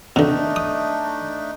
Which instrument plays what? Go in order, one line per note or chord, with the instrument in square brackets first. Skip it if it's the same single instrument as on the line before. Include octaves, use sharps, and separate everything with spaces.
[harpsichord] B2 D3 [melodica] A3 D4 D#4
[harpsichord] D#6